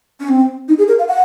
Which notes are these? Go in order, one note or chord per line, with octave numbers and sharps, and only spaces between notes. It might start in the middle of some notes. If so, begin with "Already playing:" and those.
C#4
C4
D#4
G#4
A#4
F5
F#5